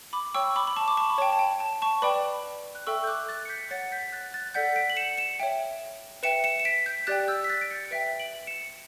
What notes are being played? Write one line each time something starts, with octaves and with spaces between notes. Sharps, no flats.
B5 D6
C#5 G5 C#6 E6
B5 D6
B5
A5 C#6
D6
A5 C#6
B5
C#5 G5 A5
A5
G5
A5
A5 C#6
B4 D5 G5 B5 D6
F#6
A4 E5 G5 C#6 E6
G6
D6 F#6
F#6 A6
C#7
G6 B6
C#5 F#5 A6 C#7
G6 B6
F#6 A6
F#6 A6
A4 D5 F#5 G6 B6
B6 D7
F#7
C#7 E7
C#7 E7
C#5 E5 G5
B4 E5 G5 C#7 E7
C#7 E7
E7
B6 D7
G6 B6
G4 D5 G5 F#6 A6
E6 G6
B6
F#6 A6
D7
A6 C#7
B4 E5 G5 B6 D7
D7 F#7
C#7 E7